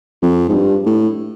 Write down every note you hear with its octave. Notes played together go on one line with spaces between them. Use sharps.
F2
G#2
G2
A2